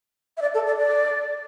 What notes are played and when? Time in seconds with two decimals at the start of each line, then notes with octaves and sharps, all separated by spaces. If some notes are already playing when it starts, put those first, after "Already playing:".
0.37 E5
0.42 D5
0.54 A4
0.67 D5
0.79 D5